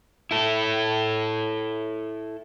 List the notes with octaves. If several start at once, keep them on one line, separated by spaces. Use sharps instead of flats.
E4 A4